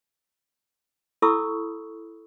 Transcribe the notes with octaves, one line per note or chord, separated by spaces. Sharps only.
E4 A4 B5 C#6 D#6 E6